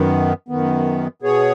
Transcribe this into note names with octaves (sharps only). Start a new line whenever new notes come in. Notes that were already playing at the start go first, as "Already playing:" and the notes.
Already playing: F#2 D#3 B3
F#2 D#3 B3
B2 B3 G#4 C#5